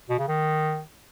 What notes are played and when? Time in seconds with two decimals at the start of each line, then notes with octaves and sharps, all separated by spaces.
0.10 B2
0.19 C#3
0.28 D#3